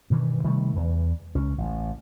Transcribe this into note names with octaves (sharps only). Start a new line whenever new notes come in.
G2 B2 D#3 E3
C3 D#3 G3 A3
E2 E3
C#2 C#4
A1